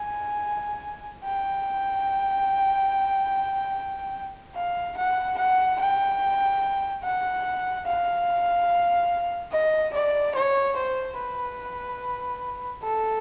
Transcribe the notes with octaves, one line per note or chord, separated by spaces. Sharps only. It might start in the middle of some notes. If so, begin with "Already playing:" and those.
Already playing: G#5
G5
F5
F#5
F#5
G5
F#5
F5
D#5
D5
C#5
C5
B4
A4